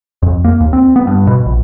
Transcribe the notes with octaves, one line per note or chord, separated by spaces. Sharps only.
F2
A#3
D#2
C4
B3
G2
B2
A#1